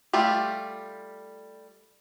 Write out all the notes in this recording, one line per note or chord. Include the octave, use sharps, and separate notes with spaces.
G3 A3 F4 G4